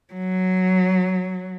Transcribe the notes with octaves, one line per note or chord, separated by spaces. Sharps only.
F#3